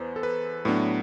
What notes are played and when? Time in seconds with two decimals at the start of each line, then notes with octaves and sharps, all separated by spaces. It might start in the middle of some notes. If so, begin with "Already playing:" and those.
Already playing: E2 B4 C5
0.16 A4
0.23 B4
0.65 A2 F#3 B3 D4 B4